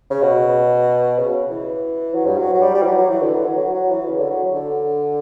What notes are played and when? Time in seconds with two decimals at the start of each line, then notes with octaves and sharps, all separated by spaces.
0.10 C#3
0.22 B2
1.18 C#3
1.50 E3
2.14 F#3
2.26 G2
2.38 F#3
2.54 F#3
2.62 G3
2.74 G3
2.82 E3
2.86 F#3
2.98 F#3
3.10 E3
3.22 D3
3.34 E3
3.46 F#3
3.58 F#3
3.74 F#3
3.91 E3
4.08 C#3
4.19 D3
4.30 F#3
4.54 D3